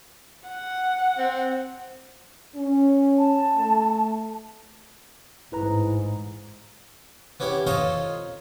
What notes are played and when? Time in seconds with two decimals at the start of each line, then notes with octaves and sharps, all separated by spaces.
0.49 F#5
1.18 C4
2.55 C#4
3.18 A5
3.57 A3
5.52 A1 G#2 E4 B4 A#5
7.40 B3 C#4 E4 G4
7.67 D#4 F4 A4 C5 C#5 D#5